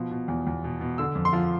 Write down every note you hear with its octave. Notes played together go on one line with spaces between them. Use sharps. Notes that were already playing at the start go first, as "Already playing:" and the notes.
Already playing: B2 F3
B2
E2
E2
B2
B2
D3 E6
F2
C6
F3